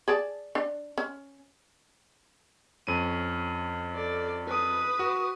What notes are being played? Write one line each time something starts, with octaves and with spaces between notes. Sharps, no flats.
G#4 D5 A5
D4
C#4
F2 C#4 D#7
A4 D5
B4 D#6
F#4